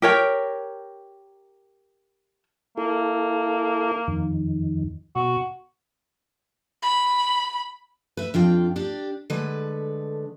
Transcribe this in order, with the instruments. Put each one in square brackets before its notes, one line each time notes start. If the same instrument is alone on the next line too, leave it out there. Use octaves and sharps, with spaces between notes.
[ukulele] G4 A#4 C#5 G5
[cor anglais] A#3 [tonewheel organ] E4 A4
[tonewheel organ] F2 D#3
[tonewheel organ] B2 [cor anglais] F#4
[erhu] B5
[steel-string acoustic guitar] B4 E5
F2 D4 F4 G5
D4 G4
D3 G#3 A3 B4